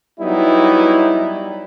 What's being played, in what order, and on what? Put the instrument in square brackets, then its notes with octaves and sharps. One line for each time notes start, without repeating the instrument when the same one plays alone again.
[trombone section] F#3 G3 B3 D#4 E4